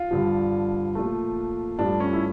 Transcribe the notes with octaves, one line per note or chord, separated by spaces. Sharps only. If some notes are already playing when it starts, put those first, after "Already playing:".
Already playing: F4
G2 D3 F3
A#2 F3 A3
G2 F3 A3 D4
C#4
E4